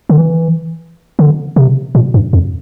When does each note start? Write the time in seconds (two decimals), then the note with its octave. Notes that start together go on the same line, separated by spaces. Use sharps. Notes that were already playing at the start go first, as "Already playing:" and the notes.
0.09 D3
0.18 E3
1.19 D3
1.56 C3
1.95 A#2
2.14 G2
2.33 F2